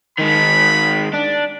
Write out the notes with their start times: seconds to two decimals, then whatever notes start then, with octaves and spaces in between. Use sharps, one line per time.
0.18 D#3 G#3 B5
1.14 D4